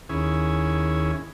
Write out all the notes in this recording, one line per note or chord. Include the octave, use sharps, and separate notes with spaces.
D#2 C#4 E4 G#4